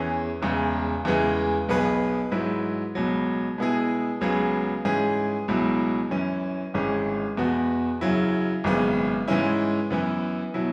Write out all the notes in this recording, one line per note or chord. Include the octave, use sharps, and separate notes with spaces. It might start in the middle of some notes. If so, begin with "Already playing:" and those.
Already playing: E2 E3 C#4 G#4
E1 E2 C#3 G#3
E2 C#3 E3 G#3 B3
B1 B2 B3 G#4 B4
G#2 F#3 E4 B4
C#2 B2 F#3
B2 G#3 B3 E4 G#4
C#2 C#3 F#3 B3 G#4
G#2 E3 C#4 G#4
C#2 B2 F#3 E4
F#2 E3 C#4
G#1 G#2 E3 C#4 G#4
E2 B2 B3 F#4
F#2 C#3 F#3 E4
G#1 F#2 C#3 G#3 B3
G#2 E3 G#3 C#4 E4
F#2 E3 B3 E4
B2 F#3 E4